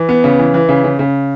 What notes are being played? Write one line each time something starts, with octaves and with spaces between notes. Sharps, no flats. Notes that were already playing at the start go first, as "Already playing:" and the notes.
Already playing: E3
B3
C#3
E3
E3
C#3
C#3
C#3